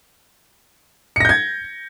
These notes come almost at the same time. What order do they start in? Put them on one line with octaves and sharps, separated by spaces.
C#7 A#6 G6 G#6